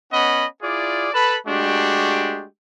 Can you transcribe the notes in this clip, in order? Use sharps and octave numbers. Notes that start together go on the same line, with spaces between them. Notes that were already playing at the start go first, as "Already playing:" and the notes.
B3 C#4 D#5 F#5 B5
E4 F4 G#4 D5
A4 B4 A5 B5
G#3 A3 D4 F#4 G4